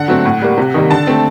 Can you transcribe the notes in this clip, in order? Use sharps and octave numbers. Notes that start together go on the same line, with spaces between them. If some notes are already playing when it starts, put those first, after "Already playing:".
Already playing: D3 F#5
F#3 A3 C4
A2
G3 A#3
C3
D#3 G3 A#3
D3 A5
A3 C4